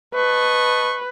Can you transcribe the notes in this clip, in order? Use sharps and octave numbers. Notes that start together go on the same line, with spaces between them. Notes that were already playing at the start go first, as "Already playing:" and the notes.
B4 D#5 A5 C#6